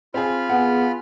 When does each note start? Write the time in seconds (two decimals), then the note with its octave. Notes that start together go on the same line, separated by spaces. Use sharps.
0.14 C4 F4 G#4 B5 F6
0.50 B3 G#4 F#5